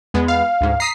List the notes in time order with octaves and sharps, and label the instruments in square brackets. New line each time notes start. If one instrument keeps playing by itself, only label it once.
[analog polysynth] E2 G#3 B3
[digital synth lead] F5
[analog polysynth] D2 G#2
[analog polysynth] A#5 D#6 B6 [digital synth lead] C7